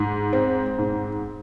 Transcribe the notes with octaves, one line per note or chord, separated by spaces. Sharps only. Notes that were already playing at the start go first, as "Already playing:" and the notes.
Already playing: G#2
C4
G#2